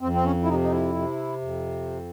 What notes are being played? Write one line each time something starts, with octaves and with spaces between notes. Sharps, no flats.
F2 C4
C4
C#4
E4
C3 D#4
D#4
E4
C3
F2